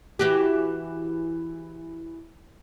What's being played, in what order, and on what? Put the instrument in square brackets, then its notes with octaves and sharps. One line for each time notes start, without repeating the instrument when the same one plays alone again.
[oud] E3 F#4 G4